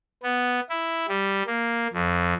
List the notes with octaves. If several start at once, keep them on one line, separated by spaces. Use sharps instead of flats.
B3
E4
G3
A#3
F2